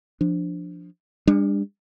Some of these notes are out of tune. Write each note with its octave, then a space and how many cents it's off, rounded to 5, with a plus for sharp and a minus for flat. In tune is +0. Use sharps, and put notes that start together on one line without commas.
F3 +0 D4 +0
G3 +45 D4 +0